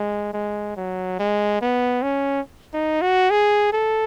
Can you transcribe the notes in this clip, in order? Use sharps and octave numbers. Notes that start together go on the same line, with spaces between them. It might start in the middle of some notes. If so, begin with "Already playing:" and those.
Already playing: G#3
G#3
F#3
G#3
B3
C#4
D#4
F#4
G#4
A4